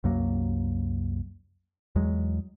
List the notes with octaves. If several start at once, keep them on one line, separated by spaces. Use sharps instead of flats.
C2 F#2 F#3 A#3
E2 F#3 G#3